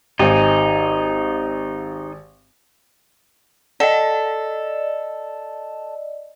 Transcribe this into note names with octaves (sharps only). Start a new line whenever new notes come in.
G#1 D#4 G4 C5 G#5
A4 D5 D#5